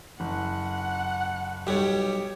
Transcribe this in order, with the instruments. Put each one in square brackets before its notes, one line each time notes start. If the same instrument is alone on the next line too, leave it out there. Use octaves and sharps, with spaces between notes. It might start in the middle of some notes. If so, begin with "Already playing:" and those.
[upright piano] F#1 [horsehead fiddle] F#5
[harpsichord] B1 G3 [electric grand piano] G4 C#5